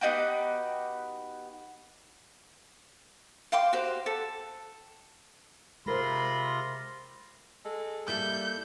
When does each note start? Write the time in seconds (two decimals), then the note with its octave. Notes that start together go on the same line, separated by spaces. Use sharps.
0.01 B3 D#4 F#4 G4
3.52 F5 G5 C6 D6
3.73 F#4 G4 C5
4.06 A4
5.86 C3 G#3 F4 A#4 C5 B5 C6 A#6
7.65 G#3 A4
8.08 G3 A#3 E4 A4 G6